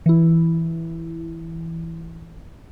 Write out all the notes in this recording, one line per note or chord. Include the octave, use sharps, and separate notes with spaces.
E3 E4